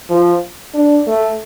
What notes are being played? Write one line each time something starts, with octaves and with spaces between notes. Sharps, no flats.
F3
D4
A3